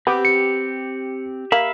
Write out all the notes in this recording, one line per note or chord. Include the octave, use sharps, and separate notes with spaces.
B3 C4 G4
C#7
A#3 E5 F5 B5